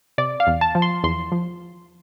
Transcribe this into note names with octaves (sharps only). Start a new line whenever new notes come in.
C3 D5
F5
E2
A5
F3
C6
E2 C6
F3